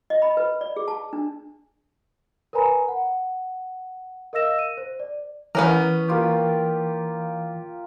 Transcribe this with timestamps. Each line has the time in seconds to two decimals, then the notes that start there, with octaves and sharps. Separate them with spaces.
0.10 D#5
0.22 B5
0.37 B4
0.61 D5
0.76 G#4
0.88 A5
1.13 D4
2.53 A#4 B4 C#5 G#5 A#5 B5
2.88 F#5
4.33 A#4 D#5 F5 E6 A#6 E7
4.59 D#7
4.77 C5
5.00 D5
5.55 E3 B3 C#4 A#4 C#5
6.08 A#3 F4 G4